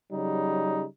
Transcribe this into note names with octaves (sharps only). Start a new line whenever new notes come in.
C#3 F#3 G3 D#4